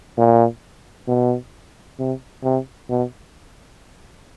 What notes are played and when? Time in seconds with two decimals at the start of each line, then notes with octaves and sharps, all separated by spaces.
0.18 A#2
1.08 B2
1.99 C3
2.44 C3
2.89 B2